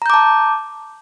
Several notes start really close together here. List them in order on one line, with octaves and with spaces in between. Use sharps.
A#5 G6 D6 A5